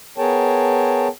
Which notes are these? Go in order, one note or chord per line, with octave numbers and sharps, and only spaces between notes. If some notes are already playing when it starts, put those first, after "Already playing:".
B3 G#4 A#4 C#5 G5 A5